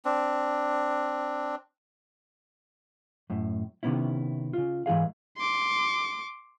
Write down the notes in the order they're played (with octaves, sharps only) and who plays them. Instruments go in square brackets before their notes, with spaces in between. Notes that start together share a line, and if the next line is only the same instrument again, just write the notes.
[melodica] C4 D4
[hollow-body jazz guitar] F#2 A2
C3 D#3 B3 C#4 E4
C#3 F4
G#2 E3 E4 G#4 F5
[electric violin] C6 D6